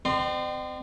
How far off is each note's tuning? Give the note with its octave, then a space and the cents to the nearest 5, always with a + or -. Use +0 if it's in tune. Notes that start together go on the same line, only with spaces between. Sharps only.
C4 -30 D#5 -45 C6 +0